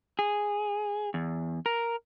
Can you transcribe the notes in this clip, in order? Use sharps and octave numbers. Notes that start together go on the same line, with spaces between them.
G#4
E2
A#4